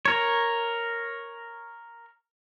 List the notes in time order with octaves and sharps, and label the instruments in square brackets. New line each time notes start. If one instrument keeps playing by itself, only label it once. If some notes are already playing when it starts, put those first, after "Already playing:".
[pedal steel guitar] A#4 C#5